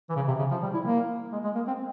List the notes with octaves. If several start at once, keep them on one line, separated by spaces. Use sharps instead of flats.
E3
C#3
C3
C#3
F3
G3
E4
A#3
G#3
G#3
A#3
C4